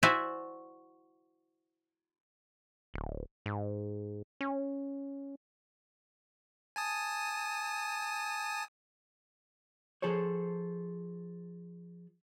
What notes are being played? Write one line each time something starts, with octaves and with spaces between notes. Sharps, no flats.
E4 F#4 C5 D5 E5 G#5
D1
G#2
C#4
G#5 A5 D#6
F3 G#4 A4 C5 C#5